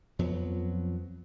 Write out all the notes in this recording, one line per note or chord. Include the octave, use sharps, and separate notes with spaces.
F2 F3 F#3 B3